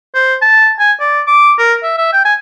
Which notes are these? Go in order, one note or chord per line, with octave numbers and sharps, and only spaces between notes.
C5
A5
G#5
D5
D6
A#4
E5
E5
G5
G#5